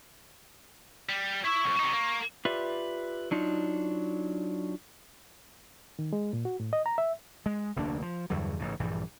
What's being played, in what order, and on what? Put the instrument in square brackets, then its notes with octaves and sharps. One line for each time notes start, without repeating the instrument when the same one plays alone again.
[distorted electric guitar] G3
[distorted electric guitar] E4 E5 [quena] C#6
[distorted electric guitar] C2 F2
C3 D#4
A#3
[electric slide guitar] F4 G4 B4 D5 E5
F#3 D4 D#4 F4
[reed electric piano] D#3
G#3
A#2
F#4
A2
D#5
A#5
E5
[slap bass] G#3
F1 D2 A#3 D4
F3
E2 G2 D3 F#3
A1 G#2 C#3
A#1 G2 E3 G3